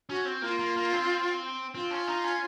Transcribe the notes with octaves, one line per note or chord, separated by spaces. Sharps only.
C#4 F#4
C4
A#3 F4
A#3
A#3
C4
C4 F4
C#4
D#4
C#4